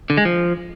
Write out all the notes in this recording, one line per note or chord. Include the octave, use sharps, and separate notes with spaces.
D3
G#3
F3